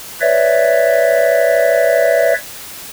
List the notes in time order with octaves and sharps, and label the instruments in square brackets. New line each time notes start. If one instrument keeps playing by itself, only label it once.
[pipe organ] B4 C#5 D5 E5